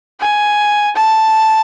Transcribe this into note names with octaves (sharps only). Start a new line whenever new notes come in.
G#5
A5